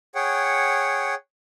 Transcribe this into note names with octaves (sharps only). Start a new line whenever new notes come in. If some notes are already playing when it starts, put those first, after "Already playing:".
G#4 C#5 F#5 G5